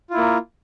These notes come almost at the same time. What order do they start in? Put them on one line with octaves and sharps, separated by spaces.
F4 E4 A#3 A#4